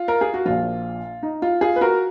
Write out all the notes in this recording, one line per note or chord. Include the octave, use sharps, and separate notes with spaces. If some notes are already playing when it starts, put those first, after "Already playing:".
Already playing: F4
A#4
G#4
F#4
A#1 A#2 F3 F4
D#4
F4
F4 G#4
B4
F#4 A#4